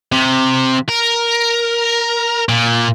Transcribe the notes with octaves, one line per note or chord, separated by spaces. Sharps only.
C3
A#4
A#2